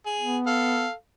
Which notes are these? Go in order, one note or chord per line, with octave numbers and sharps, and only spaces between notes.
G#4
B3
A4 F5